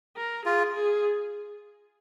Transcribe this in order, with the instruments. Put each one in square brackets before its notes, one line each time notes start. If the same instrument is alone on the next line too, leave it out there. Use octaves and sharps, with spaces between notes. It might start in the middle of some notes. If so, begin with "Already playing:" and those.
[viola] A#4
[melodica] F4 [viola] G#4
[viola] G#4